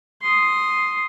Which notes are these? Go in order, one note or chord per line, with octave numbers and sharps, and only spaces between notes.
C6 D#6